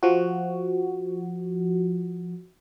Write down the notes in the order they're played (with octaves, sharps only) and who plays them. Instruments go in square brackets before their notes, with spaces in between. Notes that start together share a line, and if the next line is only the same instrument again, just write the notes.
[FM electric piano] F3 F#4